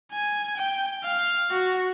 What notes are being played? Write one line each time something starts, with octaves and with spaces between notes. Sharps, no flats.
G#5
G5
F5
F#4